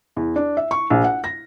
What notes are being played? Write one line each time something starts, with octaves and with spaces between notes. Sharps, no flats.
E2
D4
E5
C#6
A#1
F#5
A#6